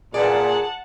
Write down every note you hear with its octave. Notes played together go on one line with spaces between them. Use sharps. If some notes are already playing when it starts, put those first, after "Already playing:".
A#2 G#4 B4 D5 F#5 A5